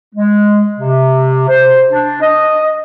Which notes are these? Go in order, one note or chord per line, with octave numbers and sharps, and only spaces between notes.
G#3
C3
C5
D4
D#5